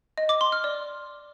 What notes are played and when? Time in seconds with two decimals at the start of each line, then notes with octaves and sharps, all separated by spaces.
0.18 D#5
0.29 D6
0.41 C6
0.52 F6
0.64 D5